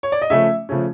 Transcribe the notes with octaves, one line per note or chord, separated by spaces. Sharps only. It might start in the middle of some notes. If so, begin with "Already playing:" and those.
C#5
D5
D#5
C#3 F3 A3 C#4 E5
C#3 F3 A3 C#4